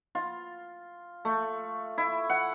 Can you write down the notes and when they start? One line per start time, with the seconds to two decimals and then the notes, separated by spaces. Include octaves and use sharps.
0.15 F4
1.25 A3
1.98 E4
2.30 F#5